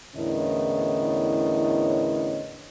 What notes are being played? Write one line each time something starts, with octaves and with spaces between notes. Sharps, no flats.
E2 A2 D3 C#4 A#4 D#5